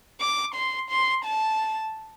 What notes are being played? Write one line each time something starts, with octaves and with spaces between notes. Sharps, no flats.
D6
C6
C6
A5